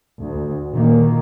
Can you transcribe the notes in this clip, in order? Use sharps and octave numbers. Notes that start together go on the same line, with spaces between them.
D2
A#2 D#3 A#3